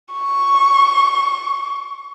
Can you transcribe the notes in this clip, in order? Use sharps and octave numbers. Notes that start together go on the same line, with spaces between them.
C#6